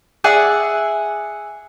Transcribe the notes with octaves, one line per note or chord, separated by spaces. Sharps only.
G#4 D5 E5 F#5